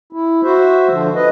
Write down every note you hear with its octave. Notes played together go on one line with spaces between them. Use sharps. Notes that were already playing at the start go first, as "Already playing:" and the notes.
E4
F#4 C5 E5
D3 F3
B4 D#5